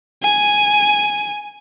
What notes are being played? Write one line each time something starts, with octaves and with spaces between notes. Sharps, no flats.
G#5